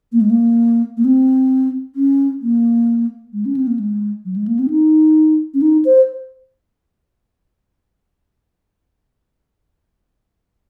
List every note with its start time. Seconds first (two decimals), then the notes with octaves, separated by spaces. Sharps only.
0.13 A#3
0.21 G#3
0.30 A#3
0.97 A#3
1.04 C4
1.96 C#4
2.42 A#3
3.33 G#3
3.46 C#4
3.57 C4
3.67 A#3
3.79 G#3
4.25 F#3
4.36 G#3
4.48 A#3
4.59 C4
4.70 D#4
5.54 C#4
5.62 D#4
5.85 C5